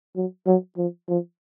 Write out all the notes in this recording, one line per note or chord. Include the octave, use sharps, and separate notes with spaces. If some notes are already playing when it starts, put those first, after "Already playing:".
F#3
F#3
F3
F3